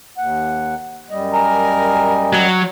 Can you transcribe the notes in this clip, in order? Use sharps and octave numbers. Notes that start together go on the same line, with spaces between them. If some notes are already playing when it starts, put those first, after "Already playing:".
D#2 F#5
F#2 G3 D#5
A#4 G#5
F#3